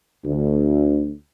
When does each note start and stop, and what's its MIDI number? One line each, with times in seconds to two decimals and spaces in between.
0.24 1.11 38